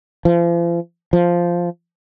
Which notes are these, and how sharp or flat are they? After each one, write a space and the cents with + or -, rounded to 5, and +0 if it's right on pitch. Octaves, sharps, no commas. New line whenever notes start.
F3 -40
F3 -5